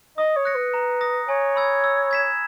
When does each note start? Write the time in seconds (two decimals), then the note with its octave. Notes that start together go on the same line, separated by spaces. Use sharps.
0.18 D#5 D#6
0.36 C#5
0.45 F#6 A#6 C#7
0.55 B4
0.74 A#5
1.01 D#6 A#6
1.28 C#5 G#5
1.56 B5 E6 G#6
1.84 E6
2.11 G#6 B6 E7